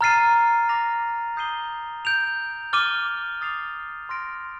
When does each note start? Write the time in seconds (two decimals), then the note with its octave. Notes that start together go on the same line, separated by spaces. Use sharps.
0.01 A#5 F6 A6 C7 D#7
0.69 D6 F6 A#6 F7
1.37 D#6 G6 C7 D#7 G7
2.05 G6 D7 F7
2.73 D6 F6 A6 D#7 G7
3.41 D#6 A6 C7 F7
4.09 C6 F6 A#6 D7